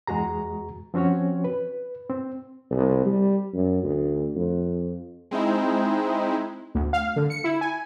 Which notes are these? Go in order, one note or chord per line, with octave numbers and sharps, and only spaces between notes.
E2 G#3 F#4 G#4 A#5
F3 C4 C#4 F#4 C#5
B4
C4
C2
G3
F#2
D2
F2
G#3 C4 D#4 E4
D2
F5
D3
C#7
E4
G#5